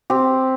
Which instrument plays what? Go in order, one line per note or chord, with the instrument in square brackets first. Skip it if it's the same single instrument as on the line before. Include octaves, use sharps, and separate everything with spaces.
[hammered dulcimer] C4 G4